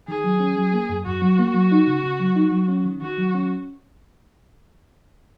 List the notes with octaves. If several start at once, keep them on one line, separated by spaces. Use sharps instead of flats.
D#3 G#4
F#3
C#4
F#3
A#3
F#2
F#2 F#4
F#3
A#3
F#3
D#4
C#3
C#3
F#3
D#4
F#3
C#4
D#3
D#3 F#4
F#3
C#4